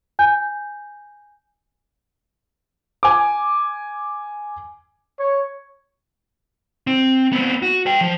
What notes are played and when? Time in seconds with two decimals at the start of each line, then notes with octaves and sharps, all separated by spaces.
0.19 G#5 G6
3.03 G#5 D6
5.19 C#5
6.87 C4
7.32 B3 C4
7.62 F#4
7.86 B4 G5
8.01 F3